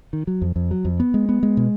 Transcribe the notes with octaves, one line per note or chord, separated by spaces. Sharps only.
D#3
F#3
F2
F2
F#3
F2
B3
G#3
B3
G#3
B2